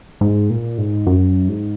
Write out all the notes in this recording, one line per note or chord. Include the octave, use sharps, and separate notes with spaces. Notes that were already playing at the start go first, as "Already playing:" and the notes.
G#2
A#2
G#2
F#2
G#2